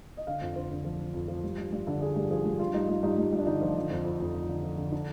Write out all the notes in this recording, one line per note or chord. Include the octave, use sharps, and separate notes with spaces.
D#5
D3 F5
F2
D3 C5
D3
F3
D3
F2
F3
G2
G2
G2
D3
D3 G#4
G2
F3 G#4
G2
G2 F4
G2 D#4
G2 F4
G2 D#4
G2
G2
D4
D3 D#4
F3
D3
F2
F2
F2
F3
D3
F3
D3
D4